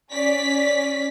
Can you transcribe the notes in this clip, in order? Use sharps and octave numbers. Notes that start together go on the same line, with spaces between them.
C#4 D5 B6